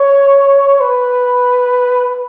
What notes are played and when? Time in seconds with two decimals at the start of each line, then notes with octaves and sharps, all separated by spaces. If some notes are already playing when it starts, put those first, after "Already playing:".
Already playing: C#5
0.80 B4